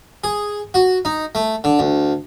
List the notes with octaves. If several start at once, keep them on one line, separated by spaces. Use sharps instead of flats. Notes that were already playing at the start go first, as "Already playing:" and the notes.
G#4
F#4
D#4
A3
D3
D2